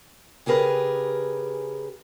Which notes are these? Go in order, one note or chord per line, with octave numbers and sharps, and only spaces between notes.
C#3 G4 G#4 A#4 B4